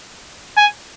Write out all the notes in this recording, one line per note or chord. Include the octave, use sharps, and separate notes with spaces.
G#5